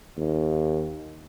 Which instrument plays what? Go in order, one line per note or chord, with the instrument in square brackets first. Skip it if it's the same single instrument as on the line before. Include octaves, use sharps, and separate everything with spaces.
[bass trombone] D#2